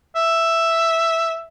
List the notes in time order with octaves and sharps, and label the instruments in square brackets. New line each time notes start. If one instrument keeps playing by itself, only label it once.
[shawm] E5